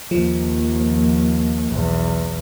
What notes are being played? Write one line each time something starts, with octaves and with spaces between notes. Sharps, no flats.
D#2 F3
B1 E2